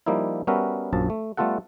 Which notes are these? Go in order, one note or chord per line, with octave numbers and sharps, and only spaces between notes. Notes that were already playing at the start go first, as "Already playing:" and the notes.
F3 G3 A#3 D#4 E4
G3 B3 C#4 F#4 A#4 E5
A#1 F#2 F3 A5
A3
G3 A3 B3 F4 A4 F#5